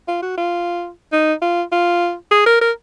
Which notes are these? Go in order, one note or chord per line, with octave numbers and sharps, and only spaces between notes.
F4
F#4
F4
D#4
F4
F4
G#4
A#4
A#4